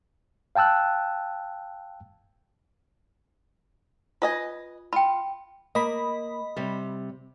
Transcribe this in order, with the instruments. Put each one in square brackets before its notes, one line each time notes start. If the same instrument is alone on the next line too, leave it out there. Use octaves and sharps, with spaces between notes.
[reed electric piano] F5 G5 A5 E6 F#6
[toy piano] F4 [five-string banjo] B4 D#5 G#5
[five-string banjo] F4 [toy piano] G5 B5
[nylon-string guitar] A#3 [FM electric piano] D#5 B5
[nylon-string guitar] C3 G3